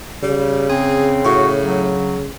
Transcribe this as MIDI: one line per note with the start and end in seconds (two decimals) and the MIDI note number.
0.23 2.28 49
0.23 0.68 55
0.69 1.22 60
0.69 1.10 68
1.25 1.97 45
1.25 1.48 66
1.60 2.19 54